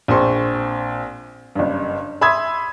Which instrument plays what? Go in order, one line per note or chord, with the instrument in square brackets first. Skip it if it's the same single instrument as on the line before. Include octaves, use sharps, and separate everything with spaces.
[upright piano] A#1 C4 C6 C#6
F#1 G2
E5 B5 C6 D#6 E6 G#6